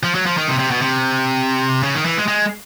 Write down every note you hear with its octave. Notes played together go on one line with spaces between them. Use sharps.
F3
F#3
F3
D#3
C3
C3
B2
C3
C#3
D#3
E3
G#3
G#3